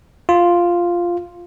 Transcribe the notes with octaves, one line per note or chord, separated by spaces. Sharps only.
F4